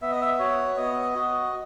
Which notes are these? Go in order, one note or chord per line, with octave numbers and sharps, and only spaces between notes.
B3 E5
D#5
E5
F#4 C#5
B3 D#5
F#4